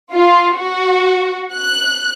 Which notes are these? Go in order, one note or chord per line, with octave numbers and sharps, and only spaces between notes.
F4
F#4
F#6